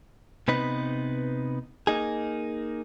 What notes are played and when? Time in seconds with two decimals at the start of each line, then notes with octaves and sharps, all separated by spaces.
0.48 C3 B3 D#4 B4
1.87 A#3 D#4 G#4